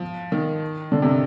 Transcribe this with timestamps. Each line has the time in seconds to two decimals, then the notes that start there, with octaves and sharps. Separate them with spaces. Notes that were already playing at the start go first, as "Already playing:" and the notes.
Already playing: F3
0.32 D#3
0.92 D3
1.02 C3